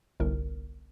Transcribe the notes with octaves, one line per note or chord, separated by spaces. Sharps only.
G1 C2 A#4